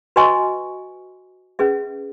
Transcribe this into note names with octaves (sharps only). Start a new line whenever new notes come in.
F#4 B4 D#5 G#5 C#6
C#4 G#4 B4 E5